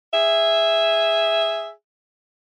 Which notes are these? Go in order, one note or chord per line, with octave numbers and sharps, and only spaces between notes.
G#4 E5